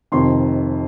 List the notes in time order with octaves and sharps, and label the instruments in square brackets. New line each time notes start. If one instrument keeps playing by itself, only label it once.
[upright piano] F1 F2 D#3 C6